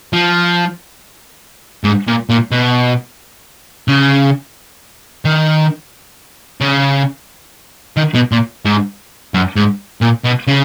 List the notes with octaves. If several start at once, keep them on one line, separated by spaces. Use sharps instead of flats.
F3
G#2
A#2
A#2
B2
C#3
D#3
C#3
D#3
B2
A#2
G#2
F#2
G#2
A#2
B2
C#3